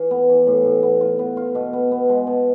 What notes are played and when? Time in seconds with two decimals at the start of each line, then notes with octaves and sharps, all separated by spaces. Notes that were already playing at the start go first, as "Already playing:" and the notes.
Already playing: E3 F4
0.11 B3
0.29 E3
0.47 A2
0.65 A2
0.83 B3
1.01 F4
1.19 B3
1.37 F4
1.55 B2
1.73 B3
1.92 B3
2.09 G#3
2.27 B2